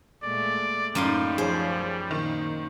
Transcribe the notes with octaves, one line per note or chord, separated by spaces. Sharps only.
A#2 G#3 A3 D5
F#2 A2 G3 A#3 D#4 F4 C6
F3 G#4 C5 C#5
A#2 D#3 D#4